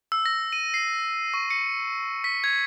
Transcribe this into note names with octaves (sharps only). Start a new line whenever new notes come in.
E6
A#6
D#7
C7
C#6
C#7
B6
G#6